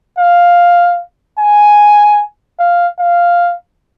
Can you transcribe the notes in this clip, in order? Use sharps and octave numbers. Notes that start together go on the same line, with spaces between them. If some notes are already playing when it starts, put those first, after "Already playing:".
F5
G#5
F5
F5